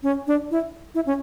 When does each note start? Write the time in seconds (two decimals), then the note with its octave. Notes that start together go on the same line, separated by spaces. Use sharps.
0.03 C#4
0.27 D4
0.51 E4
0.95 E4
1.06 C#4